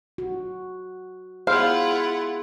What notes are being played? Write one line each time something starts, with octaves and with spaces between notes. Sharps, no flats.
F#4
B3 E4 F4 G#4 C5 F5 F#5